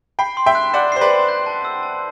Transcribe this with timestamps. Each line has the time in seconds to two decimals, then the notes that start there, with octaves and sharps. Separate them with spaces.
0.19 G5 B5 C7
0.37 C6
0.46 E5 G5
0.55 F#6
0.74 D5 F#5 E7
0.92 C5 C7
1.01 B4 D5
1.10 C6
1.29 G6
1.46 A5
1.65 E6
1.83 A5